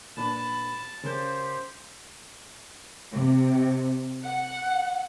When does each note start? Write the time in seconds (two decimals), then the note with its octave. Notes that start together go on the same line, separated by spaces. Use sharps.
0.17 A#2 D4 B4 A5 B5
1.04 C#3 G4 A#4 C5 G6
3.12 C3
4.24 F#5